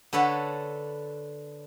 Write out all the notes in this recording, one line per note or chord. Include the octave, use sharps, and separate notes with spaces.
D3 A4 B4 C#5